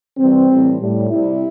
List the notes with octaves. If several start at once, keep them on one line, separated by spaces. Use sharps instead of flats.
C3 E3 G3 C4
A2 E3 G3
A2 G3
C3 G3 E4